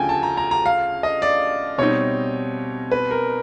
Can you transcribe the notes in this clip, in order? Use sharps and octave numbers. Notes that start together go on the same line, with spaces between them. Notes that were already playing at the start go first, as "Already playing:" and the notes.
Already playing: D2 C#3 F3 A3 G5 G#5
A5
A#5
A#5
A#5
F5
D#5
D5
B2 G3 C4 D#4 C#5
B4
A#4